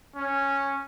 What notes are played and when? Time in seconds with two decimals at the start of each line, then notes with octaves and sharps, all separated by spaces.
0.16 C#4